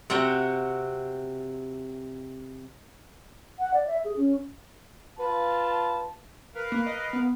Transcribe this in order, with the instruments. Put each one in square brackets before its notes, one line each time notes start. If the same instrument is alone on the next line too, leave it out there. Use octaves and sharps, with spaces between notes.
[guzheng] C3 C4 F#4 F#5 G5
[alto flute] F#5
D5
E5
G#4
C#4
[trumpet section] F4 A5 [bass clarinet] B4
[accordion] A#4 B4 F5
[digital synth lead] A#3
D#5
B3